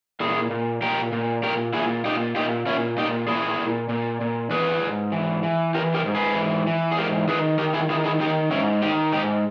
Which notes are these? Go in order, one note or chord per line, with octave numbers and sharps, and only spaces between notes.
A#2 E4 G#4
A#2
A#2 G4 A#4
A#2
A#2 G4 A#4
A#2 E4 G#4
A#2 D#4 G4
A#2 D#4 G4
A#2 C#4 E4
A#2 D#4 G4
A#2 E4 G#4
A#2
A#2
A#2
E3 G#4 B4
G#2
E3
E3
E3 G4 A#4
G4 A#4
G#2
G#4 B4
E3
E3
G#4
G#2 G4 A#4
D#3 G#4 B4
D#3 G4 A#4
E4 G#4
D#3 E4 G#4
E4 G#4
D#3 D#4 G4
G#2 C#4 E4
D#3 D#4 G4
G#2 D#4 G4